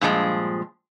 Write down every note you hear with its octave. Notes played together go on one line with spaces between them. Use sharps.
G2 A#2 F3 G#3